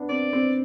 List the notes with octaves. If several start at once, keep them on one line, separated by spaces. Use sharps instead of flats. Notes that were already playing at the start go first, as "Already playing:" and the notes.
Already playing: B3 D4
C4 D5
C4